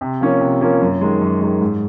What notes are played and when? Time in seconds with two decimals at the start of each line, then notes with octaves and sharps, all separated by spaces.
0.01 C3
0.21 F3 A#3 C#4
0.41 C3
0.61 F3 A#3 C#4
0.81 F#2
1.01 D#3 G#3
1.22 F#2
1.41 D#3 G#3
1.61 G#2